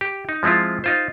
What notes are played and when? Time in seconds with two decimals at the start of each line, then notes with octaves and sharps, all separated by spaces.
0.01 G4
0.29 D#4
0.43 F3 G#3 C4 E4 F4
0.84 D#4 F4 C5